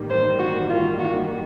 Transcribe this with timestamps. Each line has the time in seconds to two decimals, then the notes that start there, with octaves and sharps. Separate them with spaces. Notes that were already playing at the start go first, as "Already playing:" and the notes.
Already playing: A1 G2 D#3 G3 A#3
0.10 C5
0.39 F#4
0.70 F4
0.99 F#4